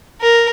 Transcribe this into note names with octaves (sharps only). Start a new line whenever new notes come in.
A#4